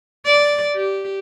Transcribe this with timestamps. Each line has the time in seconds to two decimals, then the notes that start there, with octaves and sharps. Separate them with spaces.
0.25 D5
0.76 G4